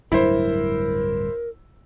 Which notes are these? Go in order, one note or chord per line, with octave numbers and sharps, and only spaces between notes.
D1 G2 F#3 E4 A#4 C5